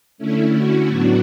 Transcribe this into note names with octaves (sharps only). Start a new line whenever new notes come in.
D3 A3 C#4 E4
F#4
A2 F#3 B3 D4